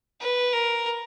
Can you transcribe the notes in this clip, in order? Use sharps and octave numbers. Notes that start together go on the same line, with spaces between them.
B4
A#4